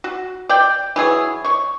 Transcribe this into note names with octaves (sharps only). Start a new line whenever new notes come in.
F#4
D5 G5
E3 F#3 G#4
C#5 C#6